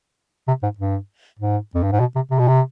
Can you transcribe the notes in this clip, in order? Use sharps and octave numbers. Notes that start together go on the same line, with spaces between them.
C3
G#2
G2
G#2
F2
G2
G#2
B2
C3
C3
B2
C3